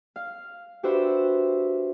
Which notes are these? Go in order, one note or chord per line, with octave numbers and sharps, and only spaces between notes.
F5
D4 F#4 G4 B4 C5 E5